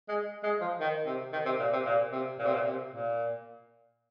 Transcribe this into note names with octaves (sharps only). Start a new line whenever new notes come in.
G#3
G#3
F3
D#3
C3
D#3
C3
A#2
C3
A#2
C3
A#2
C3
A#2
C3
A#2